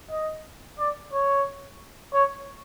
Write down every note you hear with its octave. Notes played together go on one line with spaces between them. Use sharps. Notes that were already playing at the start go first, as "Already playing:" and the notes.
D#5
D5
C#5
C#5